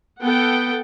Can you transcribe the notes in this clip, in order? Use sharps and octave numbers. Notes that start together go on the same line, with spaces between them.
B3 A4 F#5 G5